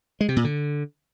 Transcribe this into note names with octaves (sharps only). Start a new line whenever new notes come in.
G#3
C3
A#2
D3